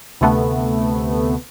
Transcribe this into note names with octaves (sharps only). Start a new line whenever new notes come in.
D2 C3 A3 B3